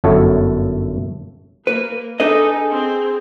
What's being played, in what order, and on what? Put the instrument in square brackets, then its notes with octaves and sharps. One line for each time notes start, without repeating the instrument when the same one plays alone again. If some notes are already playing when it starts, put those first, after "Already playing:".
[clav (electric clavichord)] G1 F#2 E4 A4 C#5 F#5
[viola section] A#3 [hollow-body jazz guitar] B4
[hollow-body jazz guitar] D4 B4 D#5 [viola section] D#4 A4 [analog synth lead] G#4
[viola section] C4